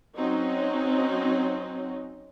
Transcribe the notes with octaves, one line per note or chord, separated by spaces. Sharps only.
F#3 C4 C#4 D#4